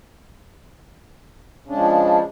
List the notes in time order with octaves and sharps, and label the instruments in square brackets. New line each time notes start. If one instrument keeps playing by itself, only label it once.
[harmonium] C#3
D4
G#3
F3